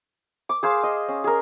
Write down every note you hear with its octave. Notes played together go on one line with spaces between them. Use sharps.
D6
G#4 C5 F5
D#5
C#4
G#4 A#4